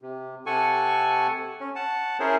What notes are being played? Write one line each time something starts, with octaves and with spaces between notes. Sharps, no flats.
C3
C3 A4 F#5 G#5 C#6
C#4
F#5 A5
C#4 E4 G#4 A#4 C5 C#5